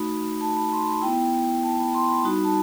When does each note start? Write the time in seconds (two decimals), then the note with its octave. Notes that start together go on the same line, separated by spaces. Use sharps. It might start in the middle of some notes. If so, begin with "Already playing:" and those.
Already playing: A3 D#4 F#4 B5
0.41 A5
0.57 B5
0.72 C6
0.88 B5
1.02 B3 E4 G5
1.63 A5
1.79 B5
1.94 C6
2.09 B5
2.24 G3 D#4 F#4 B5
2.44 A5